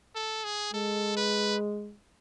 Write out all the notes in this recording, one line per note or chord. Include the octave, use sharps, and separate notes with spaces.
A4
G#4
G#3 A4
B4